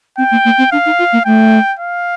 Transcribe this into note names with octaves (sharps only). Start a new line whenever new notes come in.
C4 G5
A#3
A#3
C4
D4 F5
D#4
F4
A#3
A3 G5
F5